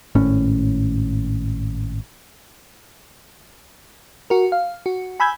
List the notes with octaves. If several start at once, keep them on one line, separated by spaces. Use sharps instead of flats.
G#1 A2 C#4
F#4 A#4
F5
F#4
G#5 B5 E6 G6 G#6